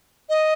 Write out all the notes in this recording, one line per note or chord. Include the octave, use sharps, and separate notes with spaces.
D#5